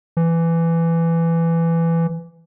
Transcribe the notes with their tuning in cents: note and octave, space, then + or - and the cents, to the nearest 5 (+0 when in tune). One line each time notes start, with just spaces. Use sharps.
E3 +15